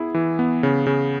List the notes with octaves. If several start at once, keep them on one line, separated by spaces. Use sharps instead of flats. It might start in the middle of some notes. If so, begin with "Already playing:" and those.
Already playing: B3 E4 G#4
E3
B3
C#3
C#3